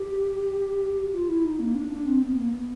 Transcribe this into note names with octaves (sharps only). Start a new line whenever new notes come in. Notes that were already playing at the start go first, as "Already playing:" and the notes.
Already playing: G4
F4
E4
D#4
A#3
D4
D4
C4
B3
A#3
B3